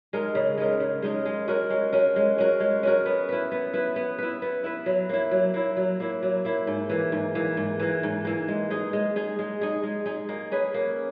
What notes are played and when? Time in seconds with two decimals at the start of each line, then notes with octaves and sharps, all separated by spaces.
0.13 G#3 D#4 A#4
0.35 C#3
0.58 G#3 D#4 A#4
0.80 C#3
1.02 G#3 D#4 A#4
1.26 G#3
1.47 C#4 F#4 A#4
1.70 G#3
1.93 C#4 F#4 A#4
2.16 G#3
2.38 C#4 F#4 A#4
2.60 G#3
2.83 C#4 F#4 A#4
3.06 B3
3.29 E4 B4
3.51 B3
3.73 E4 B4
3.96 B3
4.18 E4 B4
4.42 B3
4.64 E4 B4
4.86 F#3
5.09 A#3 E4
5.31 F#3
5.54 A#3 E4
5.77 F#3
6.00 A#3 E4
6.22 F#3
6.45 A#3 E4
6.67 G#2
6.90 E3 A#3
7.12 G#2
7.35 E3 A#3
7.57 G#2
7.80 E3 A#3
8.03 G#2
8.25 E3 A#3
8.48 G#3
8.70 D#4 G#4
8.93 G#3
9.16 D#4 G#4
9.39 G#3
9.61 D#4 G#4
9.83 G#3
10.06 D#4 G#4
10.29 A#3
10.52 C#4 G#4 B4
10.74 A#3